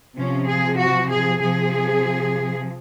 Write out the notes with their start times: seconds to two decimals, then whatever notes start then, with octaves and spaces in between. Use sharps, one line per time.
0.17 C3 F3 C#4
0.47 G#4
0.79 F#4
1.10 G#4
1.41 C3 F3 G#4